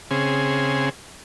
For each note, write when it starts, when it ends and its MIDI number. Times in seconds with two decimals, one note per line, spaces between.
0.11 0.89 49
0.11 0.89 60
0.11 0.89 68